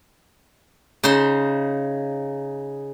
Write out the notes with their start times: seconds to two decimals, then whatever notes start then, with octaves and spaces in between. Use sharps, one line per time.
1.04 C#3 D#4 C5 C6